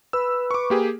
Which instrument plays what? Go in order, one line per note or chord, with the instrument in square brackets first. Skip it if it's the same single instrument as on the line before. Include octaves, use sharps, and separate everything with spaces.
[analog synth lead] B4 [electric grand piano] E6
[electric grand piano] C#6 D6
A#3 G4 G#4